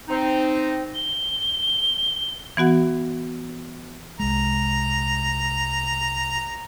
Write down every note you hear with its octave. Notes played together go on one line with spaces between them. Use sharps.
C4 D#4
G7
E3 B3 F#4 F#5
C2 G#3 A#5